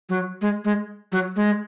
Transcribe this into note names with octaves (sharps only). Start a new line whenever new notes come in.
F#3
G#3
G#3
F#3
G#3